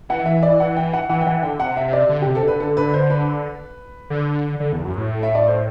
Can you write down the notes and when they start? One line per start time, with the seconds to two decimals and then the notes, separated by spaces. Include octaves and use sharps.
0.09 E3 F#5
0.26 E5
0.43 D5
0.60 F#5
0.76 G5
0.93 F#5
1.09 E3 F#5
1.21 G5
1.27 E3 F#5
1.43 D3 G5
1.59 C3 F#5
1.77 E5
1.93 D5
2.09 D3
2.22 C3 G4
2.35 A4
2.43 D3 B4
2.60 A4
2.77 B4
2.94 C5
3.10 B4
4.10 D3
4.60 D3
4.73 E2
4.85 F#2
4.97 A2
5.23 E5
5.35 D5
5.48 C5